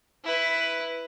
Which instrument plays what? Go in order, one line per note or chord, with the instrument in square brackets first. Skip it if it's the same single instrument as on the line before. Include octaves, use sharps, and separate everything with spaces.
[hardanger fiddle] E4 B4